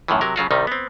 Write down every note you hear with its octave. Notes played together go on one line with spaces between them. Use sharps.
F#2 A2 D#3 E3
C3 F#3 A#4
C#3 F#3 F4 F#4
C2 C3 D#3 G3 D#4
B3 C4